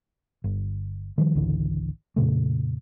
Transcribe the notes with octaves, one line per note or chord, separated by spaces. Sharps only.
G1
D#3 F3 G3
G#1 C#2 D3 E3
F2 A#2 C#3 A3